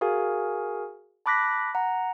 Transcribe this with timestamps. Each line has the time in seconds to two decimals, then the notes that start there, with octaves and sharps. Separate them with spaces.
0.01 F#4 G#4 A#4 F5 G#5
1.26 A5 B5 D6 F#6 A#6 B6
1.75 F#5 A#5